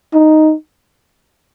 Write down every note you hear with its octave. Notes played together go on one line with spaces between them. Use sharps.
D#4